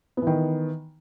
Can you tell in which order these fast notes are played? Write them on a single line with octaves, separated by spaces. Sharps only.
B3 E3 D#3